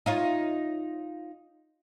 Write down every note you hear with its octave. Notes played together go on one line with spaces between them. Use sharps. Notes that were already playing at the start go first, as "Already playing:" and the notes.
D#4 F4 C#5